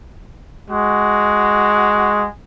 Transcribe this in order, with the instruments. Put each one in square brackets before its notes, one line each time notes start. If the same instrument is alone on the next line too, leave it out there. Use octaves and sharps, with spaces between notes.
[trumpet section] G#3 F#4